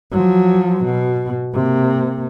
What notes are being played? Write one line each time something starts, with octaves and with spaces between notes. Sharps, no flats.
F3 F#3
B2
C3 A#3